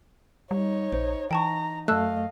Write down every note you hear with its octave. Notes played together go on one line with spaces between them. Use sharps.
G3 D#4 C#5
A#1 C5
E3 D#4 G5 A5 A#5 C#6
F#2 A3 D#5 F5 A5 E6 F#6